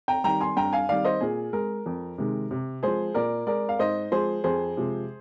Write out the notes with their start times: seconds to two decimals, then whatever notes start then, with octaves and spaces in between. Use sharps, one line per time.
0.08 G5 A#5
0.24 D#3 G3 G5 A#5
0.40 G#5 C6
0.57 G2 G5 A#5
0.73 F5 G#5
0.89 D#3 G3 D5 F5
1.04 C5 D#5
1.21 A#2 G#4
1.53 G#3 A#4
1.86 F2
2.18 C3 D#3 G#3
2.51 C3
2.83 F3 G#3 G#4 C5
3.14 A#2 A#4 D5
3.47 G#3 A#4 D5
3.69 F5
3.79 G#2 C5 D#5
4.11 F3 G#3 G#4 C5
4.44 F2 G#4 C5
4.77 C3 F3 G#3